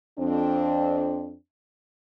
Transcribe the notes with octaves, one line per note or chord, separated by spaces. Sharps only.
F2 C4 D4